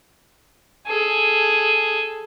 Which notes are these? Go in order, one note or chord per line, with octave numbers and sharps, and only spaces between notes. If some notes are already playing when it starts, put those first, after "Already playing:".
G#4 A4